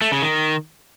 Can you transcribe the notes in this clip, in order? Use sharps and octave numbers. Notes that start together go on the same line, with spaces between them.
A3
C#3
D#3